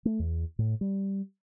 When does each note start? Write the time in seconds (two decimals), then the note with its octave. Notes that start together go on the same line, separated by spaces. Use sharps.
0.05 A3
0.19 E2
0.59 A2
0.81 G3